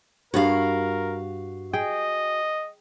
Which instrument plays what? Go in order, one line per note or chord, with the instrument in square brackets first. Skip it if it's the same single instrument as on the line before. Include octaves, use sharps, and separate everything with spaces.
[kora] G2 C#5 [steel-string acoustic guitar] F#4 F5 [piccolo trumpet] A#4
[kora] G#4 G5 [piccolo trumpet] D#5